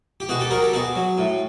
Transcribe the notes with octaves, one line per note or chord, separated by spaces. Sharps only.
G4
B2 F#4 G#4
G4 A4
F#3 G#4 A#4
G4 A4
B2 F#4 G#4
F#3
A2